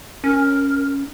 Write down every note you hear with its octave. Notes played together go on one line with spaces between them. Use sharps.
C#4 A#4